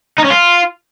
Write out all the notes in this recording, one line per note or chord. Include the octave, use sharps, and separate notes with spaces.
D#4
C#4
F4